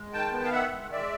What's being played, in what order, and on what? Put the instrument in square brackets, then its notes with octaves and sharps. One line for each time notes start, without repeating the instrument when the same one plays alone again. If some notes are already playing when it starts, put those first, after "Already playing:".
Already playing: [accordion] G#3
D#3 G5 A5
B3
F5
D#3 E5 F#5
G#3
G#3 D5 E5